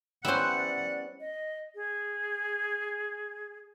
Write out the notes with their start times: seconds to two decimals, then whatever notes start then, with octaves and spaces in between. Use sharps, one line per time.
0.25 G3 B3 C#4 E4 C5 F#5 F#6
0.56 D5
1.20 D#5
1.75 G#4